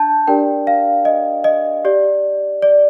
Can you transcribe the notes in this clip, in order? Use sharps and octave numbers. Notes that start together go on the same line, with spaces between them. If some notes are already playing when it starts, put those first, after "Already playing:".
Already playing: D4 A5 G6
D4 G4 A#4 D5 G5
F5
D#5
D#5
G4 D5
D5